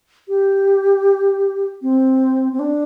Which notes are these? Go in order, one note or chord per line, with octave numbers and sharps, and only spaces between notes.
G4
C4
C4
D4